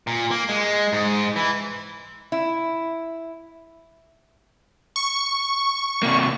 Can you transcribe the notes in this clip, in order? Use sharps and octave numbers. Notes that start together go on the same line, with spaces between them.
A#2
A#3
G#3
G#2
E3
E4
C#6
C3 A#3